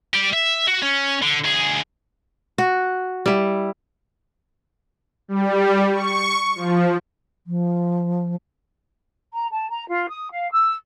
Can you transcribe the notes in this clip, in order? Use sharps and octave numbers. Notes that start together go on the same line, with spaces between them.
G4 D5
E5
F#4
C#4
D3
D2 G#4
F#4
G3 E4
G3
C#6
F3
F3
A#5
A5
A#5
F4
D#6
F5
E6